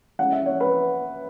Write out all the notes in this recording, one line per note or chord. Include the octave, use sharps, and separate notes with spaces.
E3 G#3 C#4 F#5
E5
C#5
B4